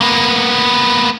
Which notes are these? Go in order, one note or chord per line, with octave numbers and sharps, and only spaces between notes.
A#3 B3